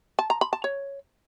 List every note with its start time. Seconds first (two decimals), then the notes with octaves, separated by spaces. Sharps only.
0.19 A5
0.30 A#5
0.41 B5
0.53 A5
0.64 C#5